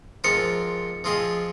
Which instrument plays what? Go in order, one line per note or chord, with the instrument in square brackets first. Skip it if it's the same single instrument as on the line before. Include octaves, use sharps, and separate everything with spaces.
[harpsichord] G#2 F3 C4 F4 A#4 [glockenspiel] C#7
[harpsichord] F3 C4 F4 G#4 D#5